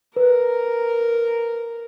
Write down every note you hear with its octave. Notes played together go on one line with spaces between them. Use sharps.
A#4 B4